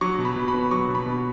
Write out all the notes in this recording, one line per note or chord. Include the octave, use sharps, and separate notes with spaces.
F#3 C#6
B2
B5
B2
B5
B3
F#3 C#6
B2
B5
B2